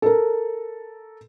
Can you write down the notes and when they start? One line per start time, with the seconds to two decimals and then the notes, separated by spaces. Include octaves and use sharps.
0.02 A4 A#4